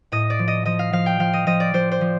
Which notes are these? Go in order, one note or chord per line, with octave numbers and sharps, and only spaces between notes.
A2 D#5
D5
F3
D#5
F3 D#5
F5
F3 F5
G5
F3 F5
D#5
F3 D#5
D5
F3 C5
C5
F3